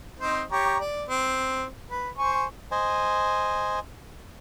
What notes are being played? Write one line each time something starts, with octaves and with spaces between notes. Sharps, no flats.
C4 D#4 C5
G4 C#5 A#5
D5
C4
B4
C5 G#5 C#6
C5 D#5 G#5